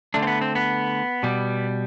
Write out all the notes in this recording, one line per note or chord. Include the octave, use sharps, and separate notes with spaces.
D3 A3 D4
C4
B3
C4
B3
B2 G3